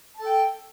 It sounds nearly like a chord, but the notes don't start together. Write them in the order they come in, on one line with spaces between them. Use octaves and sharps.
A5 A4 G5